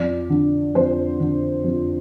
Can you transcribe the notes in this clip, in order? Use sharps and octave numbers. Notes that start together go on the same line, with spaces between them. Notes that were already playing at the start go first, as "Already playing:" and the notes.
Already playing: F2 D5
D3
F2 C5
D3
F2